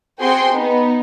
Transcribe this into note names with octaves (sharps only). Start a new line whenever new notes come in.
C4 F#4 G#4 G5 C6
B3 D#4